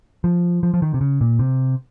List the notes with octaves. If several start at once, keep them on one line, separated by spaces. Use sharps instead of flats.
F3
F3
F3
D#3
C3
C#3
A#2
C3